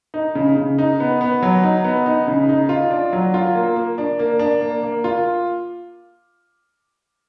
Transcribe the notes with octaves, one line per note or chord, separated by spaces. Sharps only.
D#4
C#3
C#3
D#4
B3
B3
F#3
D#4
B3
D#4
C#3
D#4
F4
D4
F#3
F4
A#3
A#3
D4
A#3
D4
A#3
A#3
F4